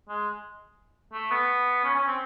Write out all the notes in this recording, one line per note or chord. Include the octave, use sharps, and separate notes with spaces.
G#3
A3
B3
C#4
C#4
C4